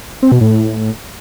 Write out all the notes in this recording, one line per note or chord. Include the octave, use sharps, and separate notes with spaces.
C4
B2
A2